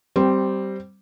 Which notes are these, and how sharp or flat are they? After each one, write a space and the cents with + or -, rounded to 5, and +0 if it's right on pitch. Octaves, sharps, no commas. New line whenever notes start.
G3 -10 C4 +0